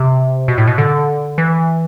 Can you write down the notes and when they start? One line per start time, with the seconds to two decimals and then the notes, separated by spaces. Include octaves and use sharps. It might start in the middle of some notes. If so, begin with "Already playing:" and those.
Already playing: C3
0.48 B2
0.58 A2
0.67 B2
0.78 D3
1.38 E3